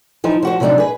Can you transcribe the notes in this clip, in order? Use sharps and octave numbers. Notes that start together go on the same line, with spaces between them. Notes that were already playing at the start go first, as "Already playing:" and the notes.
E3 F3 D#4
F3 F#4 C5
C3 F3 F#3 C4 D4 D#4
G#4 B4